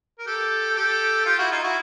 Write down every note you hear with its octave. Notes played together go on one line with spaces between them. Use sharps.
A#4
G4 A4
G4 A4
F4 G4
E4 F#4
D#4 F4
E4 F#4